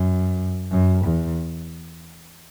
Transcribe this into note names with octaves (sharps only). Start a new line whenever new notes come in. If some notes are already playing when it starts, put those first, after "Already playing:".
Already playing: F#2
F#2
E2